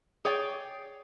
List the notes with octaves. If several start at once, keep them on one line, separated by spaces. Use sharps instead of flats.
G#4 C#5 D5 G5